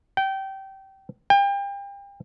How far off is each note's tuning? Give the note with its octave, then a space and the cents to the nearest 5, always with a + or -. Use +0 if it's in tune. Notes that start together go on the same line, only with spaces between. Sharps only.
G5 -20
G5 +35